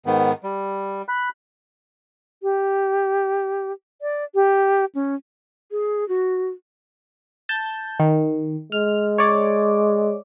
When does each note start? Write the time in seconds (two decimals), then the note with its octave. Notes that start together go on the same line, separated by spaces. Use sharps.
0.06 G#2 D#3 B3
0.44 G3
1.08 B5 F#6
2.43 G4
4.02 D5
4.35 G4
4.95 C#4
5.71 G#4
6.09 F#4
7.49 A5 G6
8.00 D#3
8.72 G#3 F6
9.18 C#5 D5 D6